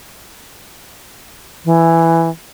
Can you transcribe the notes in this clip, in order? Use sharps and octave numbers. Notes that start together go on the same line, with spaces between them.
E3